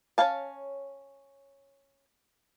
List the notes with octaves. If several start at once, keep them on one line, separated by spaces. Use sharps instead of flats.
C#4 C5 C#5 F5 A5